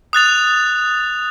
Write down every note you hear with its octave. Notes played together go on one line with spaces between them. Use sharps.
D#6 F#6 A6 F7